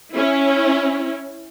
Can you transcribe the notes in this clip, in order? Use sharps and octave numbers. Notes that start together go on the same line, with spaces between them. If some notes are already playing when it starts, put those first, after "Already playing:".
C#4 E4